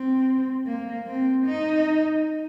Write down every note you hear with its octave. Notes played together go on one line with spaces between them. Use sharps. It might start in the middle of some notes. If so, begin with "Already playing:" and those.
Already playing: C4
A#3
C4
D#4